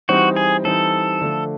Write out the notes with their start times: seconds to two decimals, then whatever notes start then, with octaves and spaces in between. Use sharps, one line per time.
0.09 E3 G3 C4 D#4 F#4
0.36 G#4
0.64 E3 G3 C4 D#4 A4
1.21 D3 F3 A3